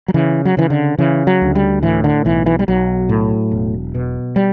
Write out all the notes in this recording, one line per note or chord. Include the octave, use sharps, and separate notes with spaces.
F#3
C#3 E3
F#3
C#3 E3
D3
C#3 E3
F#3
D2
G3
A2 E3
D3
B1 E3
E3
G3
B1 F#3
A2
E1
B2
G3